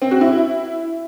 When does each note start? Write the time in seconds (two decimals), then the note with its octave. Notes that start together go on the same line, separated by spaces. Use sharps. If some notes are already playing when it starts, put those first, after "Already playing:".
0.02 C4
0.11 F#4
0.21 E4